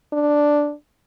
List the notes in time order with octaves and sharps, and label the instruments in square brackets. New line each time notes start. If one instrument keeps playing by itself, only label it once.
[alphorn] D4